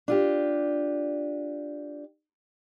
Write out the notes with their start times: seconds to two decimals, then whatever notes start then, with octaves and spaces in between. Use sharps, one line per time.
0.08 D4 F4 G4